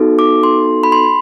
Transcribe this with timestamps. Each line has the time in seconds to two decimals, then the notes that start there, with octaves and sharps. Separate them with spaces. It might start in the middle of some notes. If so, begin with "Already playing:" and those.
Already playing: B3 D#4 F#4 A4
0.19 D6
0.43 C6
0.83 B5
0.92 C6